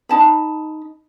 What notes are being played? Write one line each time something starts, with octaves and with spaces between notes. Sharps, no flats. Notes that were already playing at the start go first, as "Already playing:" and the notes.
D#4 A5 B5